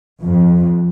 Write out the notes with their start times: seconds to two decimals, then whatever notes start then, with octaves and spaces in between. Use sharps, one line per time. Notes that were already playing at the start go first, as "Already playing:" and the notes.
0.22 F2